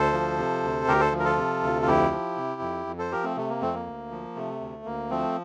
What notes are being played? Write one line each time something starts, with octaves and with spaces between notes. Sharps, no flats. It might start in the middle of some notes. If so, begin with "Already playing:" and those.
Already playing: D2 A4 C5
F3
C3
D2
D2 G4 A#4
A4 C5
F3
A#4
F4 A4
C3
D2
F4
F2 E4 G4
F3
C3
F2
F2
A4 C5
F3 G4 A#4
A3 C4
C3 A3
A#3
F2 A3 C4
A#3
D2
F3
C3 A3
D2
D2 A#3
F3 A3 C4